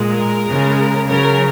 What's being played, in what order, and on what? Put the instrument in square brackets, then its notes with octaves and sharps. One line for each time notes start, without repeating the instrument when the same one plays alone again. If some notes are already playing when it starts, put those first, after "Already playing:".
Already playing: [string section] A#2 G#3
A#4
C#3 G#3
C#3 F#3 A#4